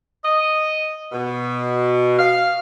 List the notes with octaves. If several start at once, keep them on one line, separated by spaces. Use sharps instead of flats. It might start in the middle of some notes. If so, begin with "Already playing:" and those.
D#5
B2
F5